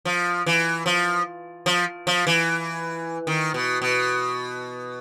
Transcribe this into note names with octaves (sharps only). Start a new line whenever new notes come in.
F3
E3
F3
F3
F3
E3
D#3
B2
B2